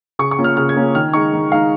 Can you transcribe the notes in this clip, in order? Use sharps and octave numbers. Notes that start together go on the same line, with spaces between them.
C#3 C#6
C#6
A#3 C#4 F4
F6
C#3 F6
G#6
A#3 C#4 F4
D#3 F6
G#3 D#4 C#6
D#3
G#3 D#4 F5